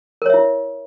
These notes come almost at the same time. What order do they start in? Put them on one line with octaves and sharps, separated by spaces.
A#4 C#5 E5 E4